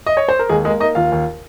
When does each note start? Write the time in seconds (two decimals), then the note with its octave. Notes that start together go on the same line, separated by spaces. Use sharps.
0.06 D#5
0.17 C#5
0.29 C5
0.39 A#4
0.49 D#2 G#3 G#4
0.65 G#3 A#3 G#4
0.80 A#3 D#4 D#5
0.95 D#2 F4 F5
1.12 D#2